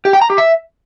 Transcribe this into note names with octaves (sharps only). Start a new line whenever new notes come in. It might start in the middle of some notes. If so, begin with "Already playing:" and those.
G4
G5
A#5
G4
E5